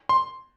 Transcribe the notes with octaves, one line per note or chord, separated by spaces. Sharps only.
C6